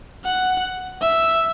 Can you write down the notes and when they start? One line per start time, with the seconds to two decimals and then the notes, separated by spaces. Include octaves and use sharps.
0.24 F#5
1.01 E5